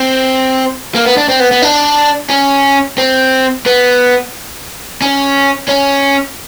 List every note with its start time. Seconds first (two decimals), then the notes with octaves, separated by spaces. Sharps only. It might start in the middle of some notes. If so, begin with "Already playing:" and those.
Already playing: C4
0.95 A#3
1.05 B3
1.17 D4
1.28 C4
1.39 B3
1.51 B3
1.62 D4
2.30 C#4
2.98 C4
3.66 B3
5.02 C#4
5.69 C#4